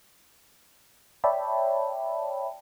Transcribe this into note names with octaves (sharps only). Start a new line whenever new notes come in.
C#5 D5 E5 G5 A5 B5